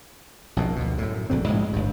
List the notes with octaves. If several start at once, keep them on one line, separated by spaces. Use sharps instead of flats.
A#1 F#2 B2
D2 B2
F#2 A2
A#1 G#2 D3 C4
A1 G#2 G#3
G1 G2